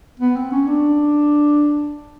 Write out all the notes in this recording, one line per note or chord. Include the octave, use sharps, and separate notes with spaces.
B3
C4
C#4
D4